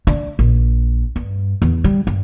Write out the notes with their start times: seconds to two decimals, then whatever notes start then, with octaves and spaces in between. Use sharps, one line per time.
0.07 D4
0.39 A#1
1.16 G2
1.62 E2
1.84 G3
2.07 G2